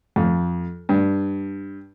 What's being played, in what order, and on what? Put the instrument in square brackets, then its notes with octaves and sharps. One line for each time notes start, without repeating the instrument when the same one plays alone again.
[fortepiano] F2
G2